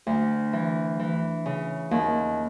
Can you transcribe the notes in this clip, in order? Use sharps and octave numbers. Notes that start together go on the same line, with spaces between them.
D2
E3
E3
C#3
D#2